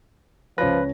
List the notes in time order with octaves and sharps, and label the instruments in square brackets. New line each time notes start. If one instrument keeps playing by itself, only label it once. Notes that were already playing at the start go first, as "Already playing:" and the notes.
[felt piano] C#2 C#5 A#6 [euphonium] F3 [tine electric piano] B4